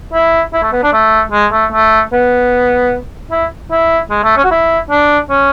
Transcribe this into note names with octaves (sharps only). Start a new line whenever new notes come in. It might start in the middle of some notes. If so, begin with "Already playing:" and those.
E4
E4
A3
B3
D4
A3
G#3
A3
A3
B3
E4
E4
G#3
A3
C#4
F#4
E4
D4
C#4